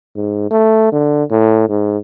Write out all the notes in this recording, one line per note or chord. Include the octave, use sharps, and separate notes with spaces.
G#2
A3
D3
A2
G#2